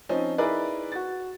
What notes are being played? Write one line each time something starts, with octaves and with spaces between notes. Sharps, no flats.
F3 C4 C#4 D#4
D#4 E4 G#4 A#4 B4 D5
F#4 A6